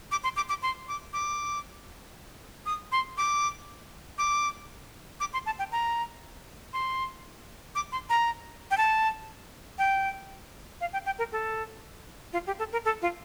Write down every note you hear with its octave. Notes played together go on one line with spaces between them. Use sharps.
D6
C6
D6
D6
C6
D6
D6
D#6
C6
D6
D6
D6
C6
A5
G5
A#5
C6
D6
C6
A#5
G5
A5
G5
F5
G5
G5
A#4
A4
F4
G4
A4
A#4
A4
F4